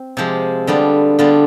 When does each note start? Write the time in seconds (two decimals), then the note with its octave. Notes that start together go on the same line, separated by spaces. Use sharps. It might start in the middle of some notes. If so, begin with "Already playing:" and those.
Already playing: C4
0.17 C3 F3 G#3
0.67 D3 G3 B3 F4
1.19 D3 G3 B3 F4